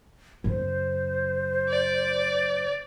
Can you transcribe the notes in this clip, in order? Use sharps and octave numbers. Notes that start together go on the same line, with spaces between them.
F#2 C#3 C5
D5